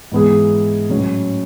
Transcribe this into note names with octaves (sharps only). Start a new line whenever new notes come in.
G#2 E3 B3 E4 G#4
A2 F#3 C#4